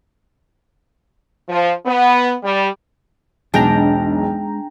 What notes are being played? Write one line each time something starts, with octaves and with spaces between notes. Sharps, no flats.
F3
B3
G3
E1 B1 G#3 D4 G#4 G5 A#5